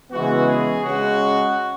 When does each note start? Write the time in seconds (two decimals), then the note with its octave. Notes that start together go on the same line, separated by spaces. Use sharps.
0.11 C#3 E3 G#3 B3 F#4
0.47 G#4
0.83 C#3 G#3 C#4 F#4